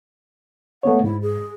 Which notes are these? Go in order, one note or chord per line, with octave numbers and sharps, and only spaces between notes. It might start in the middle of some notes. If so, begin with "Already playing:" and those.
A3 B3 C#5 F#5
G#2 E4
G#4